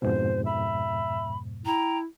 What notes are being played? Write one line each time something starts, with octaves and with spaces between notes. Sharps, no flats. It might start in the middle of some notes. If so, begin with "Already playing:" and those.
F2 G#2 B2 C5
E5 B5
E4 G5 A#5